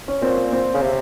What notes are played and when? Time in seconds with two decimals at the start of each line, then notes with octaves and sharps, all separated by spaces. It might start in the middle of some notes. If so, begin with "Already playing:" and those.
0.08 C#4
0.21 A#2 C4
0.52 C4
0.74 C#3
0.82 C3